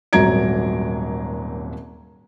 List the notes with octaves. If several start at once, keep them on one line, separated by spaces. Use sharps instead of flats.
D#1 G#1 F#3 A#5 G#6 D7